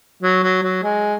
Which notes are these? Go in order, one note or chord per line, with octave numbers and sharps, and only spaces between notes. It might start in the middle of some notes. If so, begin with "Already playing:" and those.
F#3
F#3
F#3
G#3